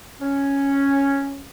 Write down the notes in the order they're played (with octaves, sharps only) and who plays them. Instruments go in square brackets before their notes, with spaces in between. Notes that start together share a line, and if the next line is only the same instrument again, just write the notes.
[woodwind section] C#4